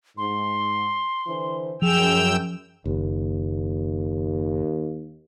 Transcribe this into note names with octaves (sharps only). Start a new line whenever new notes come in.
G#2 C6
D3 E3 C5
F#2 F3 G#4 G5 E6 F7
F#1 D#2